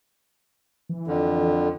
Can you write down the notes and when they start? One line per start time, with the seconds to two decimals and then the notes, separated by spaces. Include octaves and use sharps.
0.89 E3
1.07 F2 D3